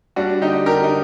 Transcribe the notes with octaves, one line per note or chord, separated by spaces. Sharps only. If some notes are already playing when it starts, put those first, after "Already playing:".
G3 D4 F#4
D3 D#4 G4
D3 G4 A#4
D#4